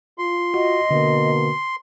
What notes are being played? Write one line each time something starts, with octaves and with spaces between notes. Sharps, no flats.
F4 C6
F#4 D#5
B2 D3 A#3